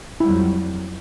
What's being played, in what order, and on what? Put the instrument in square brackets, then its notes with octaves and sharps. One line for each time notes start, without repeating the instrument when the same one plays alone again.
[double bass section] F2 F#3 G3 [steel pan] E4